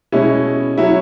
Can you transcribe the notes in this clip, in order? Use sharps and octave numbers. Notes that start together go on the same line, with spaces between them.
B2 G#3 C#4 E4
F#3 C#4 E4